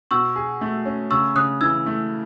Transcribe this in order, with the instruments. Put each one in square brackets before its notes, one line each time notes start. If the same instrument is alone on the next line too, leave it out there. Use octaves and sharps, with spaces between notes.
[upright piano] B2 [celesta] C#6 E6
[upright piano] G#4
A3
C#4
[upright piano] C#3 [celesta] C#6 E6
[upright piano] C#3 [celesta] D#6 F#6
[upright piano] E3 [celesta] E6 G#6
[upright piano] A3